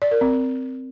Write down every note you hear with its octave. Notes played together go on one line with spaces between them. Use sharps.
D5
A#4
C4